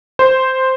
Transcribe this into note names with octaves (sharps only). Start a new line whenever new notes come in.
C5